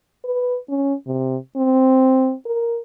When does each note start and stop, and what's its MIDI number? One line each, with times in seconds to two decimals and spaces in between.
0.24 0.58 71
0.69 0.94 61
1.07 1.37 48
1.56 2.34 60
2.46 2.79 70